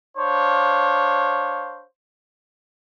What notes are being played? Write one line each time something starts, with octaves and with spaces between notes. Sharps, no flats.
D4 C5 C#5 F5